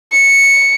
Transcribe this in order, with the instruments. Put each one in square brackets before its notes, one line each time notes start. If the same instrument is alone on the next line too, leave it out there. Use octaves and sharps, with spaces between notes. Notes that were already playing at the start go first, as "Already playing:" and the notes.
[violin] C#7